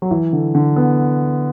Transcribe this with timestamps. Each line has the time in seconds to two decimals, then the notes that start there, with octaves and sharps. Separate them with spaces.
0.02 F#3
0.11 E3
0.33 D3
0.55 D3
0.76 B3